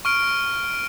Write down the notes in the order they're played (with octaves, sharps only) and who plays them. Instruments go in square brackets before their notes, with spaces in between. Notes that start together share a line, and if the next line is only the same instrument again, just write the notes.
[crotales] C#6 F6 D7